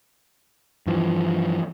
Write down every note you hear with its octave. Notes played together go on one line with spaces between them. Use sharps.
G2 E3 F3